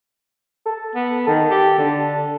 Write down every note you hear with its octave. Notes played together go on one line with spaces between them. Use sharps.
A4
B3
D#3 A4
G4
D3